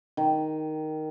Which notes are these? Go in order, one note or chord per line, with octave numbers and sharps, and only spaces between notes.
D#3